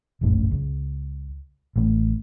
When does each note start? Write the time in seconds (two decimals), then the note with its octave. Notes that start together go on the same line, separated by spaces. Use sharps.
0.21 F1 A#1 F#2 A2
0.51 C#2
1.76 A1 A2 A3